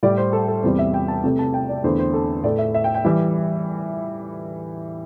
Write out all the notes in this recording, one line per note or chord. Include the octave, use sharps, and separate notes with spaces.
A2 G3 D5
C5
A4
A4
E2 C3 G3 C5
E5
G5
A5
C3 A3
A5
G5
D5
E2 D3 A3 C5
C5
A4
A2 A3 D5
E5
E5
G5
G5
E3 G3 E5